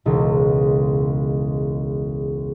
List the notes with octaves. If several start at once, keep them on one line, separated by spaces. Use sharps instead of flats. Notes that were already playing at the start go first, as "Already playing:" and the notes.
E1 C#2